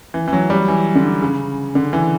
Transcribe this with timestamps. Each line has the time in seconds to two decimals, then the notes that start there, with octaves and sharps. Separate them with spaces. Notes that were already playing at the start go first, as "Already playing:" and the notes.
0.14 E3
0.28 E3
0.33 F#3
0.50 G3
0.68 E3
0.95 D3
1.22 C#3
1.75 D3
1.93 E3